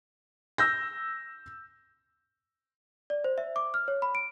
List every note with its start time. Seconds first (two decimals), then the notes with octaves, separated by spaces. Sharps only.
0.58 E6 G6 A#6
3.10 D5
3.24 C5
3.38 E5
3.56 D6
3.74 F6
3.88 C#5
4.02 B5
4.15 D7